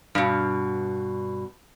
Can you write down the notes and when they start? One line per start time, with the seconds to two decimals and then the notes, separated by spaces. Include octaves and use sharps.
0.15 G2 B2